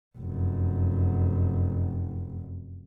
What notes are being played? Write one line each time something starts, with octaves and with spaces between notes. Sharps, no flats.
F1 F#2